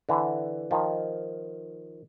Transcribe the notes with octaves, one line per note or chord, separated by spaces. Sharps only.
D3 E3
D#3 F3